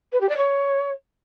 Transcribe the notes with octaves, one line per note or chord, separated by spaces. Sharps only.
B4
G4
D5
C#5